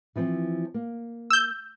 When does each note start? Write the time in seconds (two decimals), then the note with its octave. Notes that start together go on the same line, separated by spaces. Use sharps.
0.16 E3 F3 C4
0.74 A#3
1.30 E6 G6